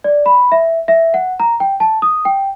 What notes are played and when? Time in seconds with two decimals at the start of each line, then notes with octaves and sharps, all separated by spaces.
0.04 D5
0.26 B5
0.52 E5
0.88 E5
1.14 F#5
1.40 A#5
1.60 G5
1.80 A5
2.02 D#6
2.25 G5